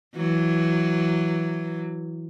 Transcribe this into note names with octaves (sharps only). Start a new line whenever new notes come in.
E3 F#3